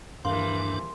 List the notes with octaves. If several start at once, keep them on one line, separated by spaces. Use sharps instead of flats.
D#1 G2 E3 D4 A#4 F5 C6